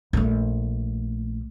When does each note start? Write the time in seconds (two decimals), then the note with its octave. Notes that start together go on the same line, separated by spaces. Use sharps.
0.13 A#1 A3